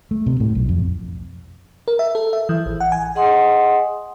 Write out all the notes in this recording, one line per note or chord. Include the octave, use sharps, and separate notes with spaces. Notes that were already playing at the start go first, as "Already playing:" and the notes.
A3
C3
A2
B1
F2
A#4
E5
A4
E5
E3
A1
F#5
G#5
G#4 D#5 F#5 G#5 C6 D#6